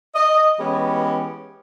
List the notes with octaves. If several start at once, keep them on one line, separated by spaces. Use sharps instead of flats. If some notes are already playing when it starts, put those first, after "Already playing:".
D#5
E3 G#3 B3 C#4 G4